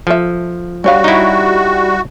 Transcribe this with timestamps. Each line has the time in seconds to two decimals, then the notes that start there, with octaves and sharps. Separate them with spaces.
0.07 F3 A4 E5
0.84 D3 G3 F#4 C#5 F5
1.04 D#4 E4